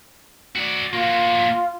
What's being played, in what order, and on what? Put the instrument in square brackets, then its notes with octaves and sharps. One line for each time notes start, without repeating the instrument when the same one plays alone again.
[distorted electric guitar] F#4 D5
[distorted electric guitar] A#3 F#4 [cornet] F4